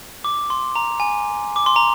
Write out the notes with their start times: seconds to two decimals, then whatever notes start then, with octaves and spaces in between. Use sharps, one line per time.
0.24 D6
0.50 C6
0.76 A#5
1.00 G#5
1.56 D6
1.66 C6
1.76 A#5